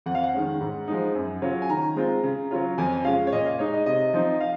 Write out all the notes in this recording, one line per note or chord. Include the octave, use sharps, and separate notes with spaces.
F2 F#5
F5
F#5
D#3 G#3 C#4
G#2
F3 G#3 D#4
F#2
C#3 F#3 C#4 F4
G#5
D#3 A#5
G#3 C4 F4
C#3
F#3 C#4 F4
F2 G#5
C#3 G#3 C#4 F4 F5
C#5
A#2 D#5
F5
G#3 D#4 C#5
D#5
C3 D#5
F3 C4 D#4
F5